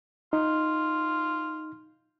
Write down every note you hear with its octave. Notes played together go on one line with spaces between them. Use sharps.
D#4 F4